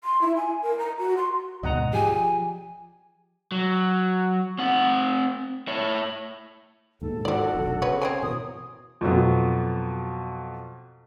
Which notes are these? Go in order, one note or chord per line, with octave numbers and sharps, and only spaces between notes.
C6
E4
G#5
A#4
A#5
F#4
C6
D2 G#2 B2 D#5 F#5 A#5
F3 G4 G#4 G#5
F#3
C4 F#5
E4 C#5
D#2 G#2 B2 A4
D#3 F3 G3 F#4 D5
F1 B1 D3
C#3 B3 B4 C#5
C4 C#5 G5 G#5
B2 E3 A#4 D#6
F2 B2 F#3 B3